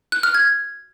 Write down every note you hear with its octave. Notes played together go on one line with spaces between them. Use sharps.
F#6
F6
G#6